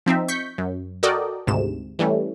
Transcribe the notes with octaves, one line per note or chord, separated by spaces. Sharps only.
F3 C4 D#4 E5
C#6 G6 B6 C#7
F#2
F#4 A4 A#4 D5 D#5 G5
G#1 D2 G#2 C3 E7
E3 G3 A3 C#4